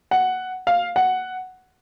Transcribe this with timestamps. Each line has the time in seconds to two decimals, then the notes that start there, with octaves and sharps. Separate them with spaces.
0.11 F#5
0.67 F5
0.96 F#5